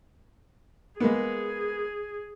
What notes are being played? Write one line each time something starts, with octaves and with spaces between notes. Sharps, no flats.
G#3 A#3 B3 G#4